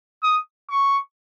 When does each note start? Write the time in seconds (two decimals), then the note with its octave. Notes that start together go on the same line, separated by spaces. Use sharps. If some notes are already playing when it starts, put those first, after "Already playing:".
0.23 D#6
0.70 C#6